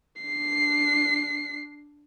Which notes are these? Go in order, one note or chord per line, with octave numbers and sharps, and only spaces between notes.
D4 C7